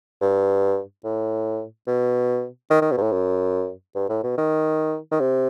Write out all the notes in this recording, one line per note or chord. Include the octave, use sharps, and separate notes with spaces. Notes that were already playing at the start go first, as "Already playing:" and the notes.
G2
A2
B2
D#3
D#3
B2
G2
A2
F#2
G2
A2
B2
D#3
D#3
C3